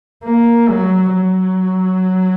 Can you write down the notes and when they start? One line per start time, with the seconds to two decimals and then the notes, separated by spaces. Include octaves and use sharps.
0.24 A#3
0.69 F#3
1.14 F#3